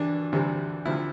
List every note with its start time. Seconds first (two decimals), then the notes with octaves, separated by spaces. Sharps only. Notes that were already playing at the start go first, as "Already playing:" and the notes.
Already playing: G2 E3 G3 D4
0.32 D2 C3 E3 G3
0.85 D2 C3 F3 E4